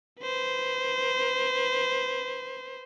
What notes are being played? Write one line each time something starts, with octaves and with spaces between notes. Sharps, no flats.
B4 C5